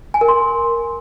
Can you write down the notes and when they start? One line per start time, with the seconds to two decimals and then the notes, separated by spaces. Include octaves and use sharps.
0.14 G#5
0.21 A#4
0.28 C6